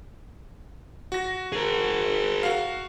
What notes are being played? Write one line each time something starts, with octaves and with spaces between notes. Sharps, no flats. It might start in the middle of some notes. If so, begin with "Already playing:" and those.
F#4 A#6
G#4 A#4
F#4 F5